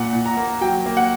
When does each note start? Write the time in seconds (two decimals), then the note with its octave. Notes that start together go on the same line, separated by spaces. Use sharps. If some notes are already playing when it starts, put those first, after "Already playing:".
Already playing: A#2 F#5
0.13 A#2
0.26 A#5
0.37 A#3
0.61 F#3 G5
0.86 A#3
0.97 F#5